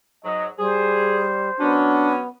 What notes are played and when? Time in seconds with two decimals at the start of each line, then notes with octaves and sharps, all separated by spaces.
0.24 G#2 F#3 D#5
0.58 G3 G#4 C5
1.60 F#3 B3 C#4 D4